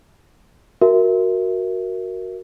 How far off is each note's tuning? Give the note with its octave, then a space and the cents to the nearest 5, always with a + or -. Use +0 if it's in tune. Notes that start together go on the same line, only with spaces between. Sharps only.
F#4 +0 A#4 +0 E5 +0